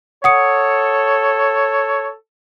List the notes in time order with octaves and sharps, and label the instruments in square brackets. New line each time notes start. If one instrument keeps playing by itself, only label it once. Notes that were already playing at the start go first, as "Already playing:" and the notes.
[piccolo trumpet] A4 [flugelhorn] C#5 [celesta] F#5 D#6 C#7